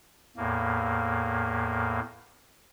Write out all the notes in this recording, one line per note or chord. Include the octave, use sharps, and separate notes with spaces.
E2 A2 A#3